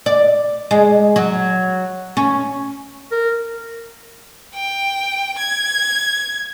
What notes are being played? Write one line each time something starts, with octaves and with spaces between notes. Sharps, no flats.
D5
G#3
F#3
C#4
A#4
G5
G#6